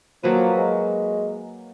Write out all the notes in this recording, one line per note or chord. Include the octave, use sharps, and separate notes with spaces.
F3 F#3 A#3 B4
G#3